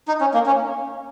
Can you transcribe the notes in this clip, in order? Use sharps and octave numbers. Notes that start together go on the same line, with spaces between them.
D#4
C#4
A#3
C#4